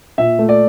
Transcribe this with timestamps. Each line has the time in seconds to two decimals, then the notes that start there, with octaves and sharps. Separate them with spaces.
0.18 A#2 E5
0.39 A3
0.49 D5